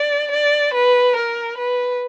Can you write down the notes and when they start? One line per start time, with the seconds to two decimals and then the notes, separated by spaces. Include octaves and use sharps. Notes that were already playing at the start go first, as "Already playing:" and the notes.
Already playing: D5
0.31 D5
0.74 B4
1.16 A#4
1.57 B4